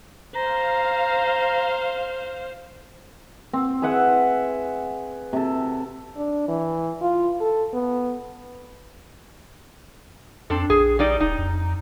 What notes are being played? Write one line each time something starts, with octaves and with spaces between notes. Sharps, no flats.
C5 F5 A#5
C4
G#4 B4 E5 F#5
C3 A4
D4
E3
F4
A4
B3
F2 C4 D4 A4
A#1 G#4
G3 D#4 D5
D#1 D#4
F2